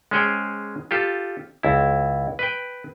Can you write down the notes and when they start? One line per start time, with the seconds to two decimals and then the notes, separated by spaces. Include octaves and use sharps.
0.11 G#3 C#4 G#4 C5 C#5 G5
0.91 F4 G4 A4
1.63 C#2 E4
2.39 B4 G5